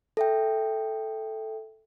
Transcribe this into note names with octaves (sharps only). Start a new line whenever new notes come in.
A4 E5 G5